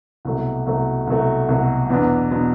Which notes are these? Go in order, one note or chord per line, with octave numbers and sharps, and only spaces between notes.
C2 B2 F#3 A3
C2 B2 F#3 A3
C2 B2 F#3 A3
C2 B2 F#3 A3
E2 B2 F#3 B3 D4
B2 F#3 B3 D4